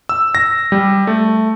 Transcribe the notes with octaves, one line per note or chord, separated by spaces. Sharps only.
E6
A#6
G3
A3